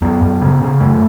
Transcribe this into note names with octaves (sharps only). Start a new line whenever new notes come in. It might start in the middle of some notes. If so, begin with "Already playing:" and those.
F#2 B3
F#2
C#3
C#3
F#2 A3